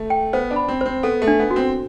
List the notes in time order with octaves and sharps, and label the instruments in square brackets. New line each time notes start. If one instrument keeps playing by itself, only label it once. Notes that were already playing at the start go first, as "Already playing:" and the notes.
Already playing: [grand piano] A3
[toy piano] G5
[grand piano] B3 [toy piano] C5
[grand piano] D4
[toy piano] B5
[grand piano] C4
[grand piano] C4 [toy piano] C5
[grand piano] B3 [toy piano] A4
[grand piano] A3
[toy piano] D4
[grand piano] B3
[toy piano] F#4
[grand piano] C4